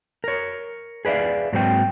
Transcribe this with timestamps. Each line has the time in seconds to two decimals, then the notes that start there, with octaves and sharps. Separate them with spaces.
0.24 A#4 C#5
1.05 G#4 B4 D5 E5 F5
1.53 G#2 F#3 A#3 C4 G#4 G5